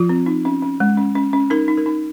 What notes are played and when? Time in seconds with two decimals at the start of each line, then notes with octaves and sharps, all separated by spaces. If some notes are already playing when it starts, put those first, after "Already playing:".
Already playing: F3 F4
0.09 C4
0.26 D#4
0.45 C#4
0.62 C#4
0.80 G#3
0.97 C#4
1.15 C#4
1.33 C#4
1.50 D#4 A#4
1.68 D#4
1.77 A#4
1.86 D#4